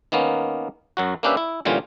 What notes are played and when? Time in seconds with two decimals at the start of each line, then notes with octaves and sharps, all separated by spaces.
0.12 D#3 A#3 B3 C#4
0.97 F#2 F#3 F#4
1.23 A#3 C#4 D4 G4 B4 E5
1.37 E4
1.65 A#2 D3 E3 G3 C#4 F4